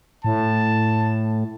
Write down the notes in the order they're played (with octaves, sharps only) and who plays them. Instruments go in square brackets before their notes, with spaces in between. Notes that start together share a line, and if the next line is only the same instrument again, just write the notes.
[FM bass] A2 [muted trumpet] A5